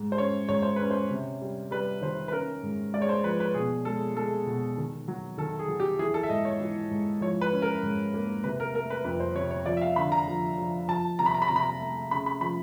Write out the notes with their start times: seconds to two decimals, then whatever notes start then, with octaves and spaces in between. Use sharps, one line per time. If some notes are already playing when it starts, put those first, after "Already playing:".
Already playing: G#2
0.12 C5
0.18 C#4 C#5
0.49 G#2 C#5
0.62 C5
0.76 C#4 B4
0.91 C5
1.10 C3
1.41 G3
1.71 G3 B4
2.02 D#3 C5
2.28 B4
2.32 C#4 A#4
2.63 G#2
2.93 G#3 D5
3.02 C#5
3.09 C5
3.24 F3 B4
3.40 B4
3.54 B2 G#4
3.85 G#3 A4
4.16 G#3 A4
4.46 B2
4.77 D#3
5.08 F#3
5.38 D#3 A4
5.59 G#4
5.68 F#3
5.80 G4
5.99 E3 G#4
6.14 A4
6.23 E5
6.30 G#2 D#5
6.45 C#5
6.61 E3
6.91 G#2
7.21 F3 C#5
7.41 B4
7.53 C#4
7.62 A#4
7.83 G#2
8.14 A#3
8.44 C3 B4
8.60 A#4
8.74 A3 A#4
8.90 B4
9.05 F2 B4
9.20 C5
9.35 C3 C#5
9.51 C#5
9.66 F3 D5
9.77 E5
9.81 F5
9.96 D3 B5
10.12 A#5
10.28 F3
10.58 F3
10.88 F3 A5
11.19 C3 A#5
11.26 B5
11.34 A#5
11.42 B5
11.48 C3 A#5
11.56 B5
11.63 A#5
11.80 A3
12.11 C#3 B5
12.26 B5
12.41 F3 B5